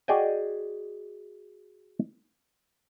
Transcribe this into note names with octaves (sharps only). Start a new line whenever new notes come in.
F#4 G#4 D5 D#5 G5 G#5